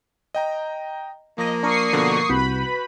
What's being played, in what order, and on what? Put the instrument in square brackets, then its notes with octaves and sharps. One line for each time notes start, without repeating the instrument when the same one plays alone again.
[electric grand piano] D#5 G5 A#5
[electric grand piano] F3 A#6 [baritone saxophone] A#3 [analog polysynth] D#5
[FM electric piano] D4 A#4 [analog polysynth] C#6 D#6 C7
[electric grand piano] B2 D3 F3
[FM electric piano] C2 [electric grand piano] F#4 G6 [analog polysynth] B4 B5